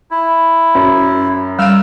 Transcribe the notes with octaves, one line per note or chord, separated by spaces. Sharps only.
E4
F#2
G3 F5 E6 F6